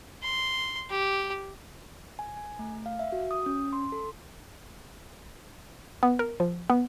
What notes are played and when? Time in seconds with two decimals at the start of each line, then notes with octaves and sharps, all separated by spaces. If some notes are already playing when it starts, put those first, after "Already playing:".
0.22 C6
0.90 G4
2.19 G#5
2.37 G#5
2.59 A3
2.86 F5
2.99 E5
3.12 F#4
3.31 D#6
3.46 C#4
3.73 C6
3.92 A4
6.03 B3
6.19 A#4
6.40 F3
6.70 B3